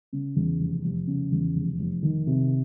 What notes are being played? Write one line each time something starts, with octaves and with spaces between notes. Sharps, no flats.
C#3
E2
F1
F1
C#3
E2
F1
F1
D#3
C3